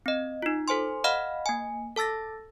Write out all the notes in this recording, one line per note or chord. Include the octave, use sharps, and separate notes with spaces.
C4 D#5
D#4 F4
A4 C5 G#5 C6
D#5 F5 F#5 B5 F6
A#3 G#5
A4 A5 E6 A6 A#6